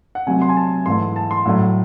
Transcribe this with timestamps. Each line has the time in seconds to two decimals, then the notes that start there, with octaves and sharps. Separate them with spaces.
0.15 F#5
0.27 C3 F#3 A3 G#5
0.42 C6
0.49 G#5
0.57 A5
0.86 G#2 E3 A3 C6
1.16 A5
1.31 C6
1.46 A2 F#3 A3